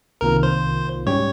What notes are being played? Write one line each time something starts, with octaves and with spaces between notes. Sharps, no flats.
C2 C3 D#3 A#3 F4 A#4
C5
G#2 G3 C#4 G4 C#5